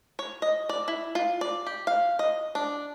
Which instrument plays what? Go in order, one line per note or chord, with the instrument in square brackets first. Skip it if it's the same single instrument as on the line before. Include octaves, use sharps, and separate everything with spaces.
[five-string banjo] C#5
D#5
D5
E4
F4
D5
G4
F5
D#5
D4